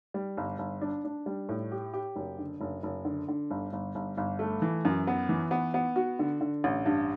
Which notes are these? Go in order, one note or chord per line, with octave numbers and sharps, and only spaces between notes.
G3
G1
G1
D4
D4
G3
A2
G4
G4
F#1
D3
F#1
F#1
D3
D3
G1
G1
G1
G1
A3
E3
F#2
B3
E3
B3
B3
F#4
D3
D3
A1
G2